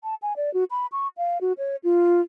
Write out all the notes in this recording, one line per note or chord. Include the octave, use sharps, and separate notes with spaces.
A5
G#5
D5
F#4
B5
C#6
F5
F#4
C#5
F4